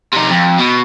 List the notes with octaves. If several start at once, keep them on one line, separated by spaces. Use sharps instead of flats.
C3 D#4
F2
B2